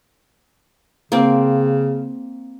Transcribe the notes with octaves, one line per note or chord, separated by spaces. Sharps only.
C#3 A#3 C4